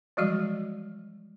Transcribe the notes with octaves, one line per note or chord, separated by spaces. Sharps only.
E3 F3 G3 G#3 F#4 D5